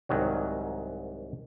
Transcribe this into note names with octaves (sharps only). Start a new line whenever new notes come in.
C2 G#2 D#3 F#3